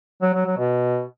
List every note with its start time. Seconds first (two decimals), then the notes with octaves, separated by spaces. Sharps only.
0.22 F#3
0.34 F#3
0.46 F#3
0.58 B2